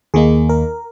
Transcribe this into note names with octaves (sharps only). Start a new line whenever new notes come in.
D#2 D#3 A#3 D#4 G#4
A#4